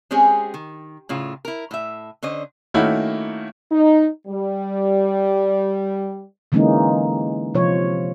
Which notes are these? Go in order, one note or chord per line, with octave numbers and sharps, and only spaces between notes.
G#3 C4 C#4 G4 G#4
D#3
A2 C#3 F4
E4 A#4
A2 E5
D3 C#4 C5 D#5
D#3 A3 A#3 C#4 E4 F#4
D#4
G3
D3 E3 G#3 A#3 C#4 D#4
C3 F3 F4 C#5